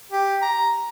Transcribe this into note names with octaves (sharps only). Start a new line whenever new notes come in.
G4
A#5